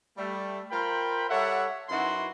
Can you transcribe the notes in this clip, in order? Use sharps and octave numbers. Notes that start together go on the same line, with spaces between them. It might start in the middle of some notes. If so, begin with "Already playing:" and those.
G3 A3
F4 A#4 C5 G5 B5
G3 A4 C#5 E5 F#5
F#2 D#4 E4 F#4 B4 C6